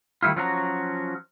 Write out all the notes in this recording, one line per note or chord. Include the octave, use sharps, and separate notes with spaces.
D#3 G3 A3 E4 F4
F3 F#3 C#4 F#4 A4 A#5